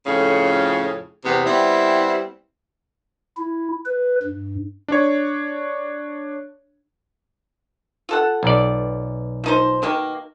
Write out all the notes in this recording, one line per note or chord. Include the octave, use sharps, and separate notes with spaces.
F2 A2 C#3 C#4
E2 C3 B3
G3 B3 C4 E4
E4
B4
G2
D4 C#5
F4 A4 F#5
B1 D5
F3 D#4 C5
B2 D#3 A#3